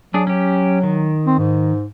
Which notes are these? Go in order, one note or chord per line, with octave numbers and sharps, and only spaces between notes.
F#3 D4 G#4
C#4 G4
D#3
C4
G#2